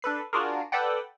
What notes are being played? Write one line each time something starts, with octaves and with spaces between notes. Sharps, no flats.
D4 A4 B4 C7
D4 F4 F#4 G#4 A#4
A4 B4 D5 F#5 G5